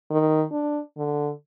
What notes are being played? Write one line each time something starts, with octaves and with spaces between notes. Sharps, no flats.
D#3
D4
D3